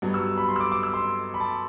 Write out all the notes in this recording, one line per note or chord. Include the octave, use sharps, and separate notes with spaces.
G2 F#3 B3
E6
B5
C6
E6
D6
D6
E6
C6
B5
A5